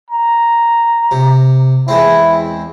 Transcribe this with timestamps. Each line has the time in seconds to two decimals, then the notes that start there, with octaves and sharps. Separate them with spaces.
0.10 A#5
1.11 C3
1.88 E2 G#3 C4 E4